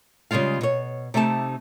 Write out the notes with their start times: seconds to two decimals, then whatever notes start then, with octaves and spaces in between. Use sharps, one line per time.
0.31 C#3 G3 G#3 F4 F5
0.61 B2 C#5
1.14 C3 A3 D#4 G4 A5